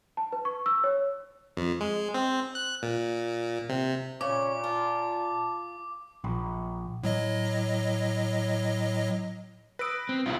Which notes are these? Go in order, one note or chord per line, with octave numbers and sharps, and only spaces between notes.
A5
B4
C#6
E6
C#5
F2
G#3
C4
F#6
A#2
C3
A#2 C#3 C#5 D6
F4 A5
A#1
A2 F#3 D#5
B4 D#6 E6 A#6 D7
C4
B1 C3 A3 E4 F4 B4